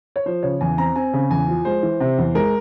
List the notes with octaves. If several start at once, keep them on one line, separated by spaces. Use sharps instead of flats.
C#5
F3 C5
C#3 C#5
E2 G#5
C4 A#5
C4 G#5
C#3
E2 G#5
F3
G#3 C5
E3
C3
E2
G#3 A#4